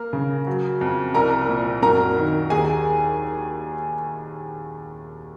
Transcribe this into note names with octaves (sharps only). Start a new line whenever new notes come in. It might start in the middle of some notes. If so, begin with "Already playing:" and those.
Already playing: A#3 A#4
C#3
F#3
F2
C2 A#4 A#5
A#2
F#2 A#4 A#5
D#3
D#2 G#4 G#5